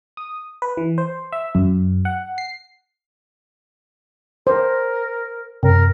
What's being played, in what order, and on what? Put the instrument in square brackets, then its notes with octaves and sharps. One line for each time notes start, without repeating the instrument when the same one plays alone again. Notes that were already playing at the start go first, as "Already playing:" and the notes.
[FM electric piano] D#6
B4
E3
C5
E5
F#2
F#5
C7
[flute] A#4 [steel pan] C5
[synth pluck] F#2 C3 [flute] A#4